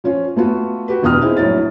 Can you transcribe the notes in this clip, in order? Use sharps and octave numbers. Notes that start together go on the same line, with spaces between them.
F3 C#4 F4
A3 B3 F4 F#4
F#4 G4 B4
E1 E2 F4 G5 D#6 F6
C4 D#4 E4 G#4
A#1 A2 F#3 E4 C#5 A6